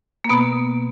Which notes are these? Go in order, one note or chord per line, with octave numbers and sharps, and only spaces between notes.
A#3
B2 B3